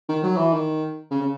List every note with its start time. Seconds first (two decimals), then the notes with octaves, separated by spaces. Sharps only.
0.09 D#3
0.23 F#3
0.37 E3
0.53 D#3
1.11 C#3
1.21 C#3